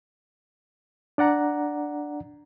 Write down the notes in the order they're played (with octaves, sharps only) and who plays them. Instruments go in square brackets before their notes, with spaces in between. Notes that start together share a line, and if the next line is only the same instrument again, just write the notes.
[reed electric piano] D4 D5 F#5 A#5